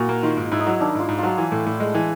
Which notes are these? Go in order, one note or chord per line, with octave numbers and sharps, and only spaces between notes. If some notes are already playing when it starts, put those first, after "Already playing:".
Already playing: A#2 E4 F#4
A#3
D#3 F4
G#2
G#2 E4
D#4
F#3 E4
D#3 D4
G#2 F4
G#2
F#3 F4
E3
A2
A2
G#3
E3